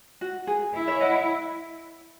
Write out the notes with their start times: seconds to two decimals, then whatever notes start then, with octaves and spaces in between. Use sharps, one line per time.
0.21 F#4
0.47 G#4
0.74 E4
0.88 C#5 E5
1.00 D#5 F#5